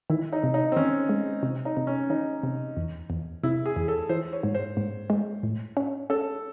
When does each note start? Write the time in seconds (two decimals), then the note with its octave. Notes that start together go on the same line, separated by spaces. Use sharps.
0.10 D#3 E4
0.32 D#4
0.43 C3
0.54 D#4
0.72 C4
0.76 D#3 C#4
1.09 G#3
1.43 C3
1.65 D#4
1.77 C3
1.87 C#4
2.10 D#3 D#4
2.43 C3
2.77 E2
3.10 E2
3.43 C3 E4
3.65 G#4
3.76 E2
3.88 A4
4.09 E3 C5
4.33 C#5
4.43 G#2
4.54 C5
4.77 G#2
5.10 G#3
5.43 A2
5.77 C#4
6.10 C#4 A4